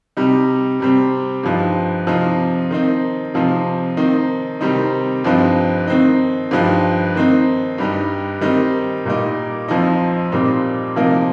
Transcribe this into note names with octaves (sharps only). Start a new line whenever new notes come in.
C3 G3 D#4
C3 G3 C4
G2 F3 D#4
C3 F3 C4 D#4
D#3 C4 D#4
C3 F3 C4 D#4
D#3 C4 D#4
C3 D#3 G3 C4 D#4
G2 F3 C4 D#4
D#3 C4 D#4
G2 F3 D#4
D#3 C4 D#4
G2 G3 D#4
D#3 G3 C4 D#4
A#2 G3 A#3 D#4
F2 F3 D#4
A#2 G3 C4 D#4
C3 F3 A#3 D#4